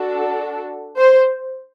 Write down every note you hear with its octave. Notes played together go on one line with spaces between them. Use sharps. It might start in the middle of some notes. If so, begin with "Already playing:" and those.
Already playing: D4 F#4 A4
C5